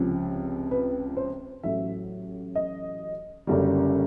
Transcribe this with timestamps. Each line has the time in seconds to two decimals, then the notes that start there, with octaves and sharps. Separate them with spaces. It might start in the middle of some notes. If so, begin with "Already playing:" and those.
Already playing: C#2 C3 F3
0.71 B4
1.17 C5
1.63 A1 A2 F#3 E5
2.55 D#5
3.47 F#1 F#2 D3 G3